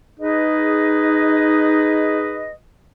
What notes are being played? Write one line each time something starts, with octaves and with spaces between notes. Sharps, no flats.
D#4 G#4 B4 D#5